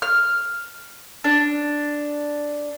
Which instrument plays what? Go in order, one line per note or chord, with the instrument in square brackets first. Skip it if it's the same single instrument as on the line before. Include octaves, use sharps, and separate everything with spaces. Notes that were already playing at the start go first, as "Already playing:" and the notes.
[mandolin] F6
D4